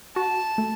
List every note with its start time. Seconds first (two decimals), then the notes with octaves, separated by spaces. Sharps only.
0.16 F#4 A5
0.58 A3